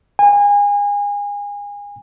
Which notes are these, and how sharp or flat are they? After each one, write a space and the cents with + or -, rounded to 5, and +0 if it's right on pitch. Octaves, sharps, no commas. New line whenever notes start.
G#5 -30